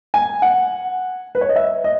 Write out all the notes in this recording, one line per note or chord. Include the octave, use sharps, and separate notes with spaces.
G#5
F#5
B4
C#5
D#5
E5
D#5